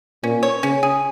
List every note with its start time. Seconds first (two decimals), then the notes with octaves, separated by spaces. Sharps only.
0.23 A#2 C#4
0.43 C#5
0.63 C#3 C#4
0.83 G#4